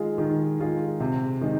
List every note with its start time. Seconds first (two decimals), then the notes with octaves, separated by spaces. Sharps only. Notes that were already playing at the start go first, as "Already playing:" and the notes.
Already playing: D#3 G#3 F4 G#4
0.18 D#3
0.59 G#3 F4 G#4
1.00 C3
1.41 D#3 G#3 D#4